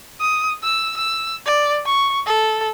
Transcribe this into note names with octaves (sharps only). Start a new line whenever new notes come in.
D#6
E6
E6
D5
C#6
A4